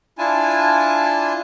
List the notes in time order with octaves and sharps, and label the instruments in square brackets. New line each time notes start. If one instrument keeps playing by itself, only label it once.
[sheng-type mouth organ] D4 E4 F4 G#5 A5